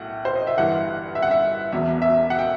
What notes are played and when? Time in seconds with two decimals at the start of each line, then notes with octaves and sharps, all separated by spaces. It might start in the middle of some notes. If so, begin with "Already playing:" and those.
Already playing: B1 A2 F#5
0.25 C5
0.36 D#5
0.47 E5
0.58 G1 G2 E3 F#5
1.15 E5
1.22 F#5
1.31 E5
1.72 E1 E2 B2 E5
2.02 E5
2.30 F#5
2.39 G5